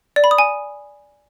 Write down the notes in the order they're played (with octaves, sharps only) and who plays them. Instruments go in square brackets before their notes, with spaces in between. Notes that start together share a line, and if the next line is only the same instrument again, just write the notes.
[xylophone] D5
B5
D#6
G#5